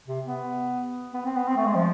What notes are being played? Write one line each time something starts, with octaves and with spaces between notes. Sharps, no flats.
C3
B3
B3
C4
B3
C4
A3
G#3
F3